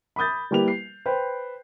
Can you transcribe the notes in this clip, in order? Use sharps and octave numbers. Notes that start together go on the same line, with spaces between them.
B5 D6 D#6 G6 A6
G3 A#3 E4 G4 B4 F7
C7
B4 C5 G5